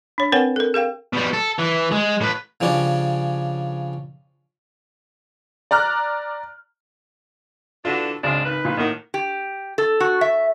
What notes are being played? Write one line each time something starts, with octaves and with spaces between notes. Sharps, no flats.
D4 C#5
C4 A#4 B4 C#5 F#5 G5
A4 A#4
G#4 A#4 F5 G5
B2 G3
A4
E3
G#3
A2 B4
C#3 F3 G3 C#4 D4
D5 A#5 F6 F#6
D3 E3 D4 F4 F#4
G#1 C#2 G#3 C4 D4
D#3 B4
A#1 A#2
A2 D#3 A#3 F#5
G4
A4
F#4
E5